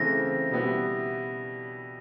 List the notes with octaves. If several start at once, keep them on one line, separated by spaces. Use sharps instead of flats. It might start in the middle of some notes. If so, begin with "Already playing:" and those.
Already playing: C#3 E3 A3 C4 A#6
B2 G3 B3 E4